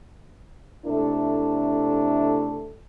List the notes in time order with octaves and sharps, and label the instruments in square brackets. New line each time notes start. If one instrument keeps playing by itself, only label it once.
[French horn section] C3 A3 D4 E4 A4